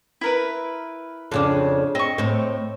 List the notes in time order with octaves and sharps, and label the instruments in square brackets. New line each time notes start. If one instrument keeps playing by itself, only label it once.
[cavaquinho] E4 A#4 B4
[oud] F2 C#3 D4
[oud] C4 [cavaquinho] D#5 C#6
[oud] A2 C4